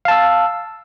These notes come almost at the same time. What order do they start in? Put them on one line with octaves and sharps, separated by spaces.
F5 A5 E6